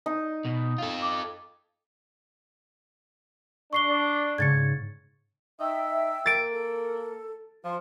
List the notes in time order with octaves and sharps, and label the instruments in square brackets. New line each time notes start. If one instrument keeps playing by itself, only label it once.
[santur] D#4
[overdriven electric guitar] B2
F4 A4
[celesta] D6
[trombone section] D4 [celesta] C#6 C7 G7
[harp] G#2 C#3 C#6 [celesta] G#6 A6 C#7
[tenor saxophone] D#4 [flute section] E5 G5 E6
[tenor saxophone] A#3 [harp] A6 D7
[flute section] A4
[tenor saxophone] F3 [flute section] F4 C6